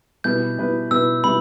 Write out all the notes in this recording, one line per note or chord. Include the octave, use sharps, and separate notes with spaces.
B2 G3 E4 B4 G6
B2 G3 E4 B4
B2 G3 E4 B4 E6
B2 G3 E4 B4 B5